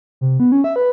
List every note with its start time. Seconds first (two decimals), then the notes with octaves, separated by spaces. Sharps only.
0.21 C3
0.40 B3
0.52 C#4
0.64 E5
0.76 B4